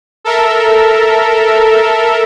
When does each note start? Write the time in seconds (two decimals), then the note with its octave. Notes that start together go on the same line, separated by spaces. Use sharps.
0.24 A4 A#4 E5